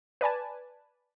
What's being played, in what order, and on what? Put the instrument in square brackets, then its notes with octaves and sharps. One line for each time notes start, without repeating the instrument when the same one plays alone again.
[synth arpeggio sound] B4 D5 G#5 A5